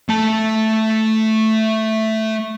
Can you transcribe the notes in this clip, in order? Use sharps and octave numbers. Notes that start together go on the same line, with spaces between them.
A3 A5